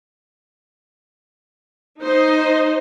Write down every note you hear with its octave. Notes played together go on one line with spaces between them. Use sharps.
D#4 C5 D#5